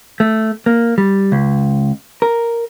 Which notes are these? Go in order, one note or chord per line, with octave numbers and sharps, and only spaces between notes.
A3
A#3
G3
C#2
A#4